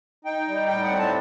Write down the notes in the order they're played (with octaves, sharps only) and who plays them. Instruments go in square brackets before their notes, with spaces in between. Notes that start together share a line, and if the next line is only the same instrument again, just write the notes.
[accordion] D#4 G5
G3
A2 G5
F#5
C4
A5